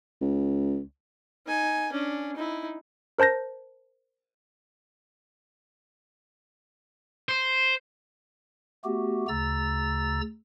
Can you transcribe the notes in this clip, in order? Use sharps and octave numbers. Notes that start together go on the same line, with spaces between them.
C#2
D#4 G#5
C#4 D4
D#4 E4
A#4 C5 A5 G6 A#6
C5
A3 B3 F#4 G4
D2 C#3 A#5 E6 A6